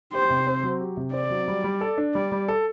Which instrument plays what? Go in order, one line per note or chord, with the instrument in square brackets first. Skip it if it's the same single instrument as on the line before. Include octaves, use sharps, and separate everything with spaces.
[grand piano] G4 [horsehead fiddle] C5
[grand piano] C3
C4
F#3
G4
C3
[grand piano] C4 [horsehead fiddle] D5
[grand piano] F#3
G3
G3
A4
D4
[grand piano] G3 [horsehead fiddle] D5
[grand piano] G3
A4